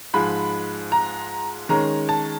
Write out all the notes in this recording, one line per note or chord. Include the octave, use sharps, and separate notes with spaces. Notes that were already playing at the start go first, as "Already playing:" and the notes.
G#2 F3 G#3 B5
A#5
D#3 G#3 C#4 A#5
A5